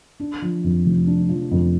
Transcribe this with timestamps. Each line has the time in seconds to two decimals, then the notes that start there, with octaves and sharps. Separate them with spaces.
0.20 D4
0.42 F3
0.64 F2
0.86 F1
1.07 D4
1.29 F3
1.51 F2